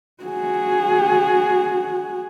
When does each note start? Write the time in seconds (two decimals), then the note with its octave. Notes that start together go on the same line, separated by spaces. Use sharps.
0.23 F#4 G#4